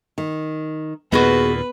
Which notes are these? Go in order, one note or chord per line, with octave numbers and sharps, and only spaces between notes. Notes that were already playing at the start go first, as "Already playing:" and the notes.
D#3
D#2 A#2 B3 F#4 G#4 B4 D#5